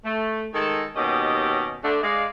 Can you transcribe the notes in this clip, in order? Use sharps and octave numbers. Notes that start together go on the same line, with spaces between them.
A3
D#3 G#3 G#4 A4
D#2 B2 C#4 D#4 G4 D#5
D3 A3 D4
G#3 D5 F5